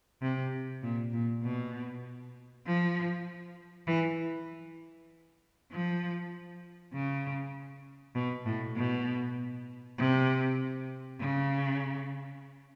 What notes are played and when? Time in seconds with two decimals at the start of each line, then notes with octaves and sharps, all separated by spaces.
0.22 C3
0.83 A#2
1.13 A#2
1.44 B2
2.67 F3
3.88 E3
5.71 F3
6.93 C#3
8.15 B2
8.46 A2
8.77 B2
9.98 C3
11.21 C#3